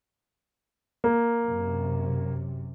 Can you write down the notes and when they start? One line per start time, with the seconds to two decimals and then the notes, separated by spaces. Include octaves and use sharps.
1.04 A#3
1.44 F#2 C3